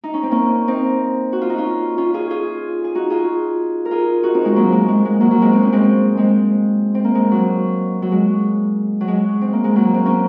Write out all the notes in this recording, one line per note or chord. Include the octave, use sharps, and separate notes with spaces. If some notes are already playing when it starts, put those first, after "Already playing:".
D#4
C#4
C4
A#3 C#4
C4 D#4
F#4
F4
D#4
C#4 F4
C#4 F4
F4 G#4
F4 G#4
G#4
D#4 F#4
F4 G#4
A#4
F4 G#4
D#4 F#4
C4 D#4
G#3 C4
F#3 A#3
G#3
G#3
G#3
F#3 A#3
F#3
G#3 C4
C4
C#4
G#3 C4
G#3 C4
C4
A#3
G#3
F#3
F#3
G#3
F#3
G#3
C4
A#3
G#3
F#3 A#3
C4
A#3 C#4